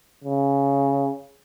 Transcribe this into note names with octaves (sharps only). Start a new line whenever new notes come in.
C#3